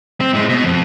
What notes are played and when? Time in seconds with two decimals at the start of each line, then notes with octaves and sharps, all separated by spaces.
0.20 C4
0.33 A2 G#3
0.49 B2
0.64 F2